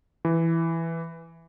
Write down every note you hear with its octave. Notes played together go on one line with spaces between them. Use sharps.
E3